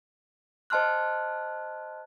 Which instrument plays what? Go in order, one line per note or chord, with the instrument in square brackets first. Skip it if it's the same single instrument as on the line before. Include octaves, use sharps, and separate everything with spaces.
[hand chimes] C5 D#5 A5 C6 F6 F#6